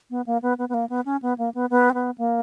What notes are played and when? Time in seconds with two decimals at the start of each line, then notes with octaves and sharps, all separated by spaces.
0.10 B3
0.26 A#3
0.42 B3
0.58 B3
0.69 B3
0.74 A#3
0.89 B3
1.05 C#4
1.22 B3
1.38 A#3
1.54 B3
1.70 B3
1.90 C4
1.94 B3
2.18 A#3